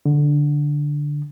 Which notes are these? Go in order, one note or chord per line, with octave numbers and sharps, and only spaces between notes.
D3